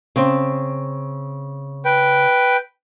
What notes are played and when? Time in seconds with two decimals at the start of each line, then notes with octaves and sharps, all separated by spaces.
0.16 C#3 C4
1.85 B4 G5